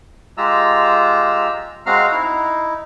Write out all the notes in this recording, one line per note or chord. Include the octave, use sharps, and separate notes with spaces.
G#3 F4 G4 A#5 E6
G#3 C4 F#4 F5 A#5 F6
D#4 E4